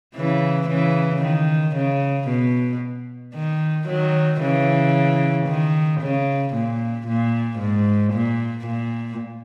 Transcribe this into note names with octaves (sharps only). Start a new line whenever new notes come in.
C#3 E3
C#3 E3
D#3
C#3
B2
D#3
D#3 F#3
C#3 E3
D#3
C#3
A#2
A#2
G#2
A#2
A#2